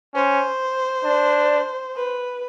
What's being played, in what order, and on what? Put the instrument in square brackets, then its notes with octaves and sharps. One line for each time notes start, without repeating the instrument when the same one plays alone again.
[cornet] C#4 [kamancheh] C5
[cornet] D4
[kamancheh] B4